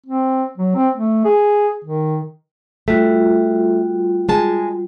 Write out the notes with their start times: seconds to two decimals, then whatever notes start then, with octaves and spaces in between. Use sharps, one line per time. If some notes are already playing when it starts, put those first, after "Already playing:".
0.07 C4
0.58 F#3
0.75 C4
0.95 A3
1.25 G#4
1.85 D#3
2.88 G3 A3 F4 F#4
4.29 G#3 G#4 A5